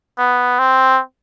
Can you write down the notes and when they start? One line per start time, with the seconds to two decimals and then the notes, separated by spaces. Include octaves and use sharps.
0.18 B3
0.59 C4